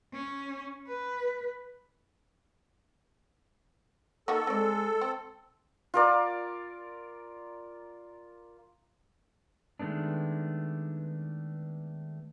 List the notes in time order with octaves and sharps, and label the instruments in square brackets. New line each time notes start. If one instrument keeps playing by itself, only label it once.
[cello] C#4
B4
[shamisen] A#3 D#4 F#4 [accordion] A4
[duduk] G#3 [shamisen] C4 D5
[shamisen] C4
[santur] F4 A#4 D5
[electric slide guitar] D#3 G#3 A3 B3 D4